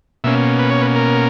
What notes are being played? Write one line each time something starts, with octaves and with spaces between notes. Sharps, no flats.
B2 A#3 C#4 E5
B4
C#5
B4
A#4